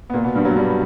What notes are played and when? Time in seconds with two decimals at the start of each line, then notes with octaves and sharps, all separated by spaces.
0.10 B3
0.14 A#2 A#3
0.24 B2 B3
0.35 G2 G3
0.45 F#3
0.56 G2 G3